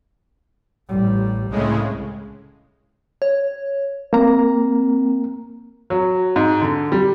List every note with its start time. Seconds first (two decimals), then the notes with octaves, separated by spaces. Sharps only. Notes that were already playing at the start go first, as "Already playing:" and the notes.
0.89 A1 G3
1.51 C2 A2 C#3 G#3
3.22 C#5
4.13 A#3 C4 A#5
5.90 F#3
6.36 G#2
6.62 D3
6.92 G3